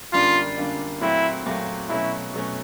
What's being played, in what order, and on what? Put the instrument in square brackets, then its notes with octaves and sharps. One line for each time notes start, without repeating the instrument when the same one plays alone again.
[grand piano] F#2 D3 G3 A#3 D4 [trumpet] F4
[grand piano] F#2 D3 G3 A#3 D4
[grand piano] A#2 F#3 A3 C4 [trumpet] E4
[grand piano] A#2 F#3 A3 C4
[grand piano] B2 F#3 A3 C#4 [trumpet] E4
[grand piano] B2 F#3 A3 C#4